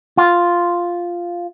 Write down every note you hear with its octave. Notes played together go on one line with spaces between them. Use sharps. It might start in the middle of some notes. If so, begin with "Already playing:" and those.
F4